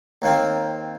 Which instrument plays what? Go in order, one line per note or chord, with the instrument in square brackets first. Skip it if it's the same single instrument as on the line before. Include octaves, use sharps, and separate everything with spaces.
[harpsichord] D#2 A#3 C4